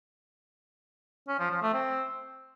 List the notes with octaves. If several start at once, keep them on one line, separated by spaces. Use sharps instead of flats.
C#4
F3
F3
A3
C4